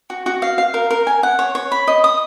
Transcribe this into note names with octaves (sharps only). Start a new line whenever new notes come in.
F#4
F#4
F5
F5
A#4
A#4
G#5
F#5
C#5
C#5
B5
D#5
D#6